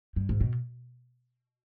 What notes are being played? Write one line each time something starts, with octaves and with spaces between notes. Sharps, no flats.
G2
G#2
B2